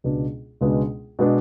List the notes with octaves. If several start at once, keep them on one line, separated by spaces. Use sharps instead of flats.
C#2 B2 G#3 B3 D4
C#2 B2 G#3 B3 D4
B2 G#3 B3 D4